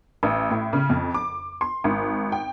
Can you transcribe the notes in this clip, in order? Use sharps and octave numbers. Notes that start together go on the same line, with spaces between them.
A1
A2
C#3
F2
D6
C6
G#1
G5